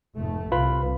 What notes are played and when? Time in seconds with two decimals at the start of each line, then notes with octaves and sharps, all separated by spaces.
0.17 F1 G#2 A3
0.52 C2 C3 F4 B4 B5